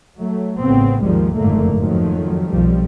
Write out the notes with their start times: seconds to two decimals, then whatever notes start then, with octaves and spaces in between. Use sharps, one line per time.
0.19 F#3 A3
0.62 A1 C#3 B3 C4
1.02 G#1 D#2 D#3 F3 G3 G#3
1.35 F#1 F2 G#2 D3 A3 A#3
1.76 F2 D#3 F3 F#3 A3
2.50 B1 F2 F3 G3